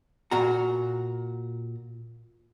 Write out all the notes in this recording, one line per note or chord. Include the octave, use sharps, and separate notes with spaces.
A#2 F#4 A#5